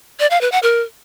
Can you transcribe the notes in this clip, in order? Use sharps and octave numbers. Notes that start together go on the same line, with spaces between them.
D5
F5
B4
F#5
A#4